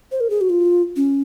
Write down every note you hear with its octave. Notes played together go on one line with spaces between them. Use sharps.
C5
A#4
G#4
F#4
F4
C#4